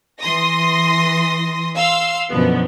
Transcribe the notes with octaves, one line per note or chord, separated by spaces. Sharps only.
E3 C6 D#6 A#6
F5 C6 E6
F#2 B2 D3 F3 B3